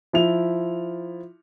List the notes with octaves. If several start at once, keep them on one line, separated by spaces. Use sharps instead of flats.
F3 E4 F7